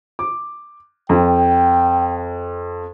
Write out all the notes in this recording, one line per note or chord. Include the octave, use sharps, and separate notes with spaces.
D6
F2 G5